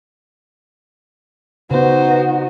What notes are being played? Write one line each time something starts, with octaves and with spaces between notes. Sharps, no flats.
C#3 B3 D#4 F#4 B4 C5